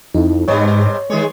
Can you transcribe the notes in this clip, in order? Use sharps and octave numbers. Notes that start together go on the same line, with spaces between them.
F2 D#4 E4
G#2 C3 G3 B3 C#5
D#3 G#3 G#4 C#5